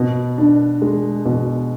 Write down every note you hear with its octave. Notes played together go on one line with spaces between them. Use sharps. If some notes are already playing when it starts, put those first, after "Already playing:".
Already playing: B2
D4
G#3
B2